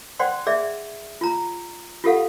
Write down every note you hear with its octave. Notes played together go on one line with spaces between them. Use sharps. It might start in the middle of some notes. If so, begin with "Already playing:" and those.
C5 D5 F#5 G5 C6
G#4 D5 E5
F4 A#5
F4 G4 A4 F5 F#5